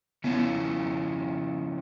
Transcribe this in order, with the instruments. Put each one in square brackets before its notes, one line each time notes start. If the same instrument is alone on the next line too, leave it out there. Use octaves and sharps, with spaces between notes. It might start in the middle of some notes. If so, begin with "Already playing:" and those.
[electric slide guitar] C#3 F3 C#4 E4 [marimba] B3